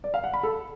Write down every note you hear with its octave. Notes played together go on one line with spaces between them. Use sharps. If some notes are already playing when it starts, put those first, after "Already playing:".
D5
F5
F#5
B5
A4